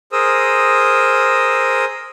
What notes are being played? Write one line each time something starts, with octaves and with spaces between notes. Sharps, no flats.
G#4 A#4 C5 D#6 E6